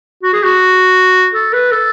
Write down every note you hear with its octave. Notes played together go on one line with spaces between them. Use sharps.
F#4
G#4
F#4
A4
B4
A4